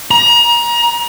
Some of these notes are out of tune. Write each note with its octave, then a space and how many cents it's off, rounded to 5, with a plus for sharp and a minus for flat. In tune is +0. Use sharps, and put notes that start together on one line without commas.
A#5 +30